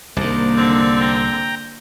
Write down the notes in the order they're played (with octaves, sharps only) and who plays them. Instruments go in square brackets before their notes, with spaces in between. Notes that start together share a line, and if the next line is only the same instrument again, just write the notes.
[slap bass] C2 G#2 [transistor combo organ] D#3 D4 [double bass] A#3
[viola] D3 C4
[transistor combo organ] G5 A#5